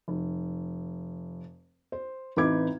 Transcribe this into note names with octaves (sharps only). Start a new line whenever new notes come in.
F1
C5
A1 C4 D#4 B4 D6 G#6